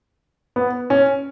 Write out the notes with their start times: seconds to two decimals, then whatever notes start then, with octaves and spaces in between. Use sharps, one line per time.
0.56 B3
0.90 C#4